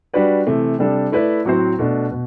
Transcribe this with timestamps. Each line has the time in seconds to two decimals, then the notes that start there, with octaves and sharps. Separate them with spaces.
0.14 G3 D4 F#4 B4 D5
0.47 C3 E3 A3
0.79 C3 G3 D4 A4
1.12 A3 E4 B4 D5
1.45 A2 F#3 C4 F#4 C5
1.79 B2 A3 D4
2.11 B2